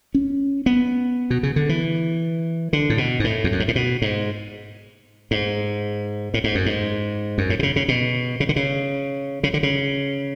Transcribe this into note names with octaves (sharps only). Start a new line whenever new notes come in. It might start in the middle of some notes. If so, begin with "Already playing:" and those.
C#4
B3
B2
C#3
D3
E3
D3
A2
B2
G#2
A2
E2
F#2
G#2
A2
B2
G#2
G#2
A2
G#2
F#2
G#2
F#2
A2
B2
C#3
C#3
B2
C#3
D3
C#3
C#3
D3
C#3